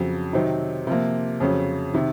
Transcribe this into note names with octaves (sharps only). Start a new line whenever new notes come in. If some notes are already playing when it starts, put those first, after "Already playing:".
Already playing: F2 C#3 F#3
C3 D#3 F#3 C4 D#4
C3 F3 A#3
F2 C#3 F#3 C#4
C3 D#3